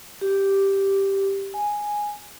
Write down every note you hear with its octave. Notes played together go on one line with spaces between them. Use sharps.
G4
G#5